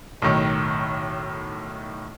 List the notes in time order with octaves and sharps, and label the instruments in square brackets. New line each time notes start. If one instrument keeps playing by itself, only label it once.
[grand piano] B1 A2 D#3